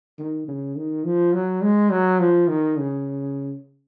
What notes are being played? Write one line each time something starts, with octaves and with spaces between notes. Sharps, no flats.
D#3
C#3
D#3
F3
F#3
G#3
F#3
F3
D#3
C#3